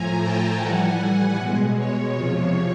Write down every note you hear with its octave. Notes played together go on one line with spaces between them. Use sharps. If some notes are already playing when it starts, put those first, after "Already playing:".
Already playing: A2 F3 A3 G#5 A#5
G5 A5
A2 E3 G3 F#5 G#5
B2 G#3
C#5
E2 C3 F3 C#5